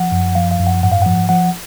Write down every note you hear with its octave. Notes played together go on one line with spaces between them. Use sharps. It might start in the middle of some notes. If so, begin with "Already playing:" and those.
Already playing: F3 F#5
F#2
F3 F5
F5
F#2
F#5
G#2 F#5
F5
F3 F#5
F3 F#5